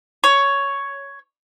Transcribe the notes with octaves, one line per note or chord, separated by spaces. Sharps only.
C#5